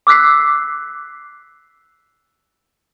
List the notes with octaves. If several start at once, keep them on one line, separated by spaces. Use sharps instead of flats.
D6 E6 F#6 B6 C7